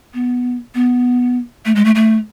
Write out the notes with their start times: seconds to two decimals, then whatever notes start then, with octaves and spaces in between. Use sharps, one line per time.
0.14 B3
0.75 B3
1.65 A3
1.76 G#3
1.85 A3
1.95 A3